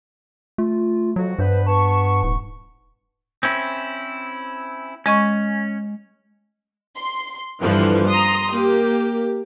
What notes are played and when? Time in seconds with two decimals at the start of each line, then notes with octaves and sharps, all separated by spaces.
0.58 A3 F4
1.16 F2 F#3 F#4
1.39 G2 B3 D4 B4 C5
1.67 B3 A5 C#6
2.23 D#1 G#2
3.43 C4 C#4 E4
5.06 G#3 C#4 D#5 C#6
6.96 C6
7.61 G2 D3 E3 F3
8.08 A#5 C6 D#6
8.52 A#3 G4